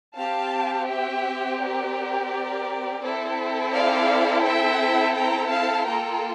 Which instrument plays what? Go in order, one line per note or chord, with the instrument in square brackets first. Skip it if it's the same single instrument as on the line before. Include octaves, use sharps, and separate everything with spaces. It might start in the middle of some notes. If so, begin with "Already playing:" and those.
[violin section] C4 G4 F5 A5
E5 G5
A#4 D5
C4 E4 A4
D5 F5
E5 G5
G5 A#5
F5 A5
A#3 F4 A4 G5 A#5